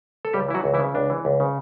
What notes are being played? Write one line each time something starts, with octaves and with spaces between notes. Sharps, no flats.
A4
C#2 G3 G4
E3 E4
F#3 F#4
C#2
E3 E4
C#3
C#2 D4
E3
C#2
C#3